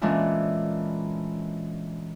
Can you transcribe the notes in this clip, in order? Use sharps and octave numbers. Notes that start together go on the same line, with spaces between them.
A#2 E3 G#3 C#4 D4 E4